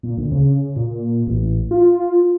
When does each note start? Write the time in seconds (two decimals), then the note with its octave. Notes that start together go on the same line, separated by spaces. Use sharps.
0.03 A#2
0.17 D2
0.32 C#3
0.76 A#2
1.27 A1
1.71 F4